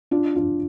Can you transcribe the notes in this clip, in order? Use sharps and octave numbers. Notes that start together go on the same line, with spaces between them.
D4 F4
D4 F4